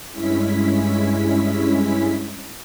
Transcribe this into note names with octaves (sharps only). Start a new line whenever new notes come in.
G2 G#3 C#4 E4 B6